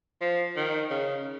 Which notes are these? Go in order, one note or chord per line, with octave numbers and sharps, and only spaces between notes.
F3
D#3
C#3